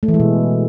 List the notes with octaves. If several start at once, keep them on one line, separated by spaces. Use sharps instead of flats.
A3
E3
G#3
B2